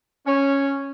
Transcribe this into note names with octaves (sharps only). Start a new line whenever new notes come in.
C#4